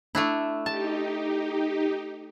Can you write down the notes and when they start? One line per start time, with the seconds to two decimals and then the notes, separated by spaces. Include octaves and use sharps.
0.15 A3 D4 E4
0.66 D#4 G4 A5